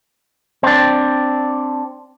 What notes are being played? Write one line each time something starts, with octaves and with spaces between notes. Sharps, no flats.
C4 D4